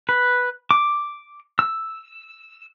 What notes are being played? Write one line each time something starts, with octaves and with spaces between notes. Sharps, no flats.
B4
D6
E6